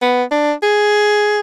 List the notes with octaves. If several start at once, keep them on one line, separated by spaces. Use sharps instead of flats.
B3
D4
G#4